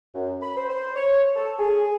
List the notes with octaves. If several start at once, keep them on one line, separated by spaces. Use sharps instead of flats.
F#2
B5
C5
C5
C#5
A4
G#4